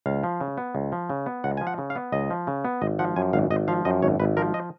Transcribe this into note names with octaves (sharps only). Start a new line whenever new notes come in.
C#2 F5
F3
C#3
B3
C#2
F3
C#3
B3
C#2 F#5
F3 G#5
F#5
C#3
F5
B3
C#2 D#5
F3
C#3
B3
G#1 D#5
F3 F#5
F#2 G#5
G#1 F5
G#1 D#5
F3 F5
F#2 D#5
G#1 C#5
G#1 B4
F3 A#4
D#5